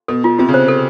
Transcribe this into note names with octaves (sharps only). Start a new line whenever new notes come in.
B2 A4
F4
C3 F4
C#3
C5
A4